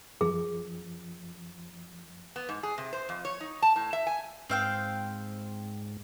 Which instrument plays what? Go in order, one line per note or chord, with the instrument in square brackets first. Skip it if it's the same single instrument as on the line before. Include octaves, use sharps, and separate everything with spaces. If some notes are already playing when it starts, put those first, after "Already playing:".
[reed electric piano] F#2 F3 [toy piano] G#4
[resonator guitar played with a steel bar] B3
G#2
G#4
C3
C5
F2
C#5
D#4
A5
A2
E5
G#5
[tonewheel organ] G#2 [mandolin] C4 F5 G5